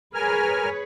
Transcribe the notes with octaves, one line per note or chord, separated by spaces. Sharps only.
G#4 A#4 B4 C#5 G#5 F6